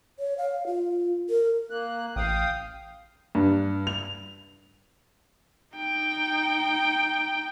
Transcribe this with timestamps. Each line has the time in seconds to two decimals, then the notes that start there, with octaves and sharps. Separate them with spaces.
0.19 C#5
0.38 F5
0.67 F4
1.29 A#4
1.70 A#3 F#6
2.16 A1 F5 G5 D#6
3.35 G2
3.87 F7
5.77 D#4 G5